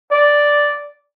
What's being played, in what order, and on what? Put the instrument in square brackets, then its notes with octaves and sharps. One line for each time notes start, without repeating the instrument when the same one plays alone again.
[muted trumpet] D5